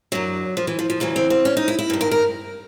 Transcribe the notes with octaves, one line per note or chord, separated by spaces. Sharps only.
F#2 D3 F#3
F3
E3
F3
F3
D2 C#3 E3 F#3
C4
C4
C#4
D#4
E4
E4
G2 D#3
A#4
A#4